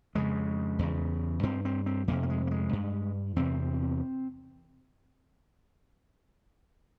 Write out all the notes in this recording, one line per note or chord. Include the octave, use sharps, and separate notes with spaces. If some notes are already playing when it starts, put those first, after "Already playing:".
F2 C#3 G#3
E2 C#3
G2 C4
C4
C4
F2 C3 A#3
A#3
G#3
A#3
G#3
G2
E2 C3 C4